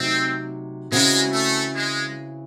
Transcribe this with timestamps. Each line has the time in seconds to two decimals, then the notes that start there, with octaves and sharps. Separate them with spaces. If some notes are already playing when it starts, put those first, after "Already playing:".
Already playing: C3 F#3 A3 C4 D#4
0.91 C#3 E3 G#3 C4 F#4
1.32 A3
1.75 G#3